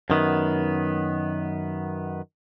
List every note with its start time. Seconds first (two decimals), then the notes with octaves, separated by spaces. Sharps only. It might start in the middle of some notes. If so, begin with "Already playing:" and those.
0.10 F#2 D#3 B3